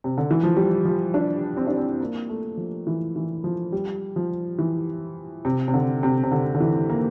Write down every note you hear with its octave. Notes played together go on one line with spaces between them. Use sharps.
C3
D3
E3
F3
G3
F3
D4
C4
D4
C4
A#3
A3
F3
E3
E3
F3
G3
F3
E3
C3
C3
D3
C3
C3
D3
D3
E3
A#3